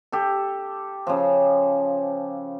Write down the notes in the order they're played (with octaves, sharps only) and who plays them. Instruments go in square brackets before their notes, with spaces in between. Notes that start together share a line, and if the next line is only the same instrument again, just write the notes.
[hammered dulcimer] G4 A4
C#3 F3